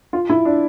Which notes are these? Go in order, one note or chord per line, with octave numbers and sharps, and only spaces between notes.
F4
E4
D4